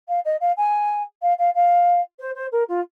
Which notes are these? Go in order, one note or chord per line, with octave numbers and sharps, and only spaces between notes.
F5
D#5
F5
G#5
F5
F5
F5
C5
C5
A#4
F4